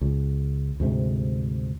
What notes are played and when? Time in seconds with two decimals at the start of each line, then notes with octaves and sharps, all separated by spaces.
0.01 C#2
0.80 D2 G#2 C3